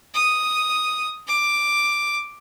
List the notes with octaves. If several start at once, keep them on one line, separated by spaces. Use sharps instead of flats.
D#6
D6